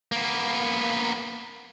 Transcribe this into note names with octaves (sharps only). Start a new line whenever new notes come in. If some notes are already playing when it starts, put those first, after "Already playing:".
A#3 B3